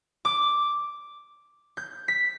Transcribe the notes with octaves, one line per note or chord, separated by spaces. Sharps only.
D6
G6
B6